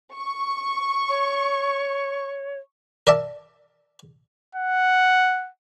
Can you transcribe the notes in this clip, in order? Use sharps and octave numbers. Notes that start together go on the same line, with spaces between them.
C#6
C#5
A#4 D5 E5 A5
F#5